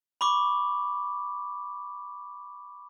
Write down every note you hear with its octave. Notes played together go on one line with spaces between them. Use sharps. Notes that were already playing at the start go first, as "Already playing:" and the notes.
B5 C#6 D6